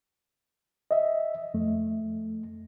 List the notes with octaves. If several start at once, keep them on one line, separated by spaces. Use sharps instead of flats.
D#5 E5
F2 A3